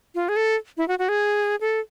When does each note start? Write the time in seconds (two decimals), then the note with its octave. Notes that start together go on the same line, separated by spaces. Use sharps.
0.15 F4
0.29 G#4
0.36 A4
0.77 E4
0.88 F#4
0.99 F#4
1.09 G#4
1.61 A4